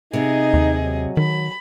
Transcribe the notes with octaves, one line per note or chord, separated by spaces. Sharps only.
C3 B3 D#4 G#4 D#5
D#2
F#3
D#3 B5